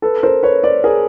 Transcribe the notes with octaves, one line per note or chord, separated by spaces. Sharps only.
A4 B4
A#4 C5
B4 C#5
C5 D5
G#4 A#4